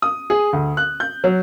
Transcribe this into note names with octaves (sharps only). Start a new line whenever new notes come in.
D#6
G#4
D2
F#6
G6
F#3